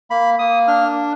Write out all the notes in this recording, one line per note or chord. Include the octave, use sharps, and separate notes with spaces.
A#3 B5
A#3 D#6
D4 F6